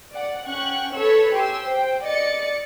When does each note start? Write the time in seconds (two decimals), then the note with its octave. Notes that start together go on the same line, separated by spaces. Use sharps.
0.13 D5 F#5
0.45 C#4 F#5 G5 C#6 F#6
0.95 A4 B4 C#5 B5 C#6 E6
1.33 G4 G#5 C6 E6
1.64 C5 G5
2.04 D5 D#5 A6 C#7